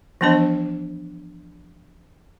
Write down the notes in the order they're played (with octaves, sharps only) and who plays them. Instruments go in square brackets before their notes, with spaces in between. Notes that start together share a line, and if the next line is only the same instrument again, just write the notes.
[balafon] E3 F3 B3 D4 C5 D#5